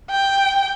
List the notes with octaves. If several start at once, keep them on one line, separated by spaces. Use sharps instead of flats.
G5